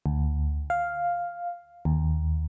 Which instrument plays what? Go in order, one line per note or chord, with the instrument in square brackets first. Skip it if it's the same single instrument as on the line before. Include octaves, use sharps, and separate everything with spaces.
[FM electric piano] D2
F5
D#2